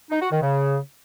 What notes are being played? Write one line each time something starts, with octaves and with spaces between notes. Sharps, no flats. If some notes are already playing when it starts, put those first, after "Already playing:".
D#4
F#4
D#3
C#3